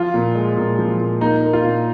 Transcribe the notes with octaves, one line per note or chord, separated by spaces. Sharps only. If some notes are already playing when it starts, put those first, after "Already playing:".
Already playing: F3 F4
A#2
G#3
A#2
F3
A#2
A#3 D#4
A#3
F4
A#2